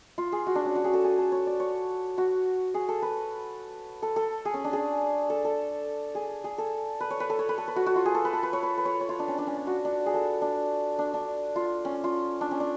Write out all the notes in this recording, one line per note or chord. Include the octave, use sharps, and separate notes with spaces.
F4
G#4
F#4
D4
C#4
F#4
G#4
A4
G#4
A4
C#5
D5
C#5
F#4
G#4
A4
B4
A4
A4
G#4
C#4
D4
G#4
A4
A4
G#4
G#4
A4
B4
C#5
B4
A4
C#5
B4
A4
B4
F#4
F#4
F4
G#4
A4
B4
A4
B4
C#5
B4
B4
C#5
C#5
F4
D4
C#4
D4
C#4
D4
F#4
D4
G#4
A4
D4
D4
D4
F4
C#4
F4
D4
C#4
D4